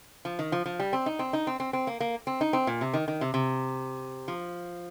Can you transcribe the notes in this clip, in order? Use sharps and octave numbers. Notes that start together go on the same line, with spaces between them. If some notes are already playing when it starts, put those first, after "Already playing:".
F3
D#3
F3
F3
G3
C4
D#4
C4
D#4
C4
C4
C4
A#3
A#3
C4
D#4
C4
A#2
C3
D#3
D#3
C3
C3
F3